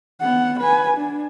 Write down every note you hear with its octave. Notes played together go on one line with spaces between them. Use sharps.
B3 F#5
B4 G#5
D4